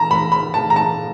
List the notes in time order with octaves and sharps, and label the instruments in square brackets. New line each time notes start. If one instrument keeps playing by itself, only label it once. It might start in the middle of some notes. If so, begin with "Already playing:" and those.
Already playing: [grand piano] A5 A#5
B5
B5
A5
A#5
A5